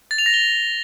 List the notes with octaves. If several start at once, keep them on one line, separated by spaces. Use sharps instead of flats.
A6
F7
A#6
G7